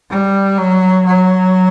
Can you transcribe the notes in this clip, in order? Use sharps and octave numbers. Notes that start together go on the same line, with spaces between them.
G3
F#3
F#3